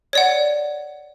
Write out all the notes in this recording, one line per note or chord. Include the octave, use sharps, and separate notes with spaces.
C#5 D5 F#5